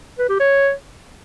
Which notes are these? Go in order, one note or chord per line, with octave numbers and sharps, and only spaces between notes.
B4
G4
C#5